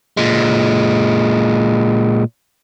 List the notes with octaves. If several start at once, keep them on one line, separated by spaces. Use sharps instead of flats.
A#2 G#3